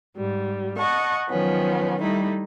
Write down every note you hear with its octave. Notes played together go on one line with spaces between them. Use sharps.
G#2 G3
D#5 F#5 A5 C#6
D#3 F3 F#3 B3 C#4
G3 A3 D#4 E4